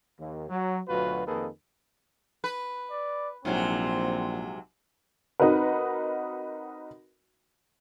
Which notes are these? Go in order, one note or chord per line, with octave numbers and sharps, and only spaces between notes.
D#2
F#3
D2 B2 F#3 F4 F#4 B4
F2 D#3 A#3 G#4 A4 B4
B4
D5
A#1 G#2 C3 F#3 C4
C4 D#4 F#4 A#4 B4